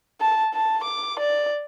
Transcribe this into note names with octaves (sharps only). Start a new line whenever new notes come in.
A5
A5
D6
D5